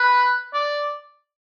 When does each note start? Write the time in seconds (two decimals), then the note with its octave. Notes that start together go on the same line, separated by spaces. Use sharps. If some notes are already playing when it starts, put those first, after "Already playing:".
Already playing: B4
0.54 D5